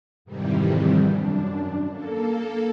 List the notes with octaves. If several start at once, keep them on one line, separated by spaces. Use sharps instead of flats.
F2 G#2 C3 D#3 E3 G3
F#2 D4
A#3 A4